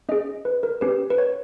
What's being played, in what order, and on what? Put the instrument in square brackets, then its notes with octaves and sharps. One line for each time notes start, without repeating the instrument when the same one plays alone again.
[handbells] C#4 G#4 D#5
B4
A#4
C#4 G4 B4
B4
C#5